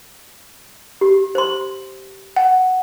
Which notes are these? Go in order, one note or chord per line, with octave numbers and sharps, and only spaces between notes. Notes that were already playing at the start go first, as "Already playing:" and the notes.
G4
C5 C6
F#5